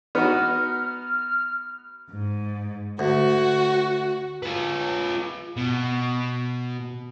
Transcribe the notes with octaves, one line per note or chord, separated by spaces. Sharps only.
B3 D#4 F#4 F6
G#2
D2 F#4
F4 B4
B2